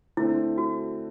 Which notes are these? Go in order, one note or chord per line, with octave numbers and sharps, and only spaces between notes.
D3 A3 C4 E4
F#4